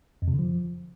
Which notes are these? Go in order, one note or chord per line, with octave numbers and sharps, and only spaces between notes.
F2
C3
D3
F3